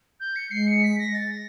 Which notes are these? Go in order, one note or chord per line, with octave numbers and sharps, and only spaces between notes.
G6
C#7
G#3 C7
C#7
B6
A#6
A6
A#6